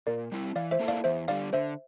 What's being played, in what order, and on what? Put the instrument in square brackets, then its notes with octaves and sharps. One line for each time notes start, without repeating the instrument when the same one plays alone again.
[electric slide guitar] A#2 [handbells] A#4 D5
[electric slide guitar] G3 C4 E4
[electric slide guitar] E3 [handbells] D5 F5
[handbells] C5 E5
[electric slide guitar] A#3 E4 A4
[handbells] D5 F5
[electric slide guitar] E2 [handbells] C5 E5
[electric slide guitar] D3 G3 [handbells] D5 F5
[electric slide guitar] D3 [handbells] C5 E5